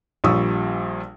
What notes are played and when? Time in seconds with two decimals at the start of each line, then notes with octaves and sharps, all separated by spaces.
0.24 A#1 A#2 G3 C#6 D#6 E6